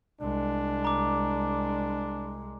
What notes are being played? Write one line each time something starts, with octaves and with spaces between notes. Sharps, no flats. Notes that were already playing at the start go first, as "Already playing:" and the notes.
C2 G#3 D4
A#5 D6